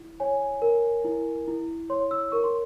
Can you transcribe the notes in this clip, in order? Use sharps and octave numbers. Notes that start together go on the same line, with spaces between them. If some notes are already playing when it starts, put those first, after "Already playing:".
Already playing: E4
C#5 G#5
A#4
E4
E4
C#5 C6
E6
A#4 C#6
C6